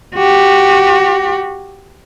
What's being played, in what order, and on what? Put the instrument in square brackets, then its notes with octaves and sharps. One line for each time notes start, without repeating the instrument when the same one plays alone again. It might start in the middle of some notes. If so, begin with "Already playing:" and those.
[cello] F#4 G4